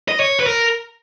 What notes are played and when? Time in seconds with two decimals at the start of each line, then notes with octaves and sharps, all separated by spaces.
0.08 D#5
0.20 C#5
0.40 B4
0.47 A#4